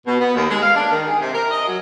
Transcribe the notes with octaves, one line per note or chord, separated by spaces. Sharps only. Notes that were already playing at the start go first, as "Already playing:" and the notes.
B2
B3
D#2
G#3
F5
D4
D#3
G#4
C3
A#4
D#5
F#3